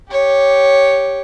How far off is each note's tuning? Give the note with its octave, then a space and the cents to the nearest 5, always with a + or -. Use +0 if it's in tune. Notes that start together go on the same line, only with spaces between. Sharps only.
G4 +0 C#5 +0